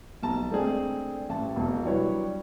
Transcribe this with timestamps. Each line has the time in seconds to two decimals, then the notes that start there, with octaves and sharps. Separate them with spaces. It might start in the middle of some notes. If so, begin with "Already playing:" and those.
0.23 B1 A5 A#5
0.51 G#3 A3 C4 D4 G#4
1.29 A1 A5
1.56 E1
1.84 F#3 G3 D4 E4 B4 C#5